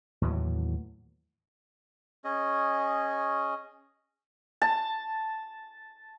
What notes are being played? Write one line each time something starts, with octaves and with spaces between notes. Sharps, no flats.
D#2 A2 E3 F#3
C#4 G#4 D#5
A5